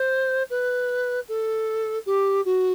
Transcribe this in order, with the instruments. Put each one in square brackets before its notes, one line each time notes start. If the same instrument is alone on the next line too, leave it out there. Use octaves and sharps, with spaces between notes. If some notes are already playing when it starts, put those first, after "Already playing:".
Already playing: [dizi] C5
B4
A4
G4
F#4